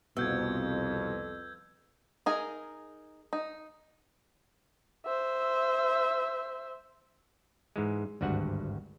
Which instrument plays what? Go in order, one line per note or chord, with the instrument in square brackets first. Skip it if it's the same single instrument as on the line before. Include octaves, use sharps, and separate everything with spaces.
[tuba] C2 [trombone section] F2 [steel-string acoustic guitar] B2 [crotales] E6 G6 G#6
[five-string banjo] D#4 G#4 A#4
D#4
[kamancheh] C5 E5
[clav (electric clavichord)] G#2 E3 G#3
G#1 D2 G2 F#4 F#5